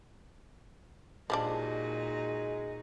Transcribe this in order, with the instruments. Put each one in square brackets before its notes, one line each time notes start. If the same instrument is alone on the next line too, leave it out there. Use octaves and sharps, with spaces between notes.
[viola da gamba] A#2 D#4 F#4 [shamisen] F3 G3 D4 [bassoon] G#3